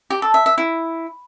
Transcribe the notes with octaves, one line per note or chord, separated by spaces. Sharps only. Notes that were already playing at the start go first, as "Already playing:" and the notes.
G4
A4
E5
E5
E4